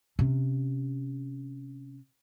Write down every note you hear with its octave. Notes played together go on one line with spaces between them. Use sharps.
C3 C#4